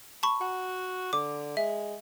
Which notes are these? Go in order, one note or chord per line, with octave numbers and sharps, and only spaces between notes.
A5 B5 C#6
F#4 F#5
D3 D6
G#3 E5